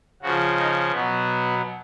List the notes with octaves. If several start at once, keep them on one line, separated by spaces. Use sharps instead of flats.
C#3 F3 F#4
D#4
B2 F#3 B3